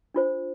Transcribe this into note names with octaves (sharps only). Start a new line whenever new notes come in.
D4 F4 C5